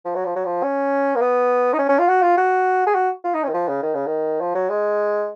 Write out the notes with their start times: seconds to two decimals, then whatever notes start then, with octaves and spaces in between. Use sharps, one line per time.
0.05 F3
0.15 F#3
0.26 F3
0.35 F#3
0.45 F3
0.63 C#4
1.15 A#3
1.21 B3
1.73 D#4
1.79 C#4
1.89 C#4
1.99 F4
2.08 F#4
2.22 F4
2.37 F#4
2.86 G#4
2.95 F#4
3.24 F4
3.34 D#4
3.44 C#4
3.49 D#3
3.54 F3
3.68 C#3
3.83 D#3
3.95 C#3
4.07 D#3
4.41 F3
4.55 F#3
4.69 G#3